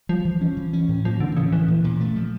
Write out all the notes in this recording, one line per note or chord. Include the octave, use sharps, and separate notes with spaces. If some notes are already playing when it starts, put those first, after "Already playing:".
F3 G3
E3
C#4
E3
C#4
A2
F3 A#3
D3 E3
C#3 C#4
E3 F3
A#2
A#2
A3
F3